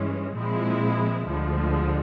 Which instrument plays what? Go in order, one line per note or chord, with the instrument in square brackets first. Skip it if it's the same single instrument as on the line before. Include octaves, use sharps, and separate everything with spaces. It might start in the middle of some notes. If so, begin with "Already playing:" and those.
Already playing: [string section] G2 E3 G#3 C#4
A#2 F3 G#3 C4 E4
D2 D3 F3 G#3